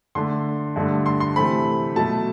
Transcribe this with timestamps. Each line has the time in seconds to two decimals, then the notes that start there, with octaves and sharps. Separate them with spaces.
0.15 D3 A3 D4 C6
0.76 G2 D3 A3 D4
1.06 C6
1.20 C6
1.36 C3 E3 A3 C4 B5
1.96 B2 F#3 A3 A5